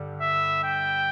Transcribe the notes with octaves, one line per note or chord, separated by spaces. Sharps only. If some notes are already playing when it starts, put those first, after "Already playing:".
Already playing: G2 D3 G3
E5
G5